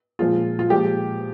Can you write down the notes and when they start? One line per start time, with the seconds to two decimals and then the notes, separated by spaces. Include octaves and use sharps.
0.19 A#2 F3 G#3 F4
0.59 F4
0.70 A#2 F3 G#3 G4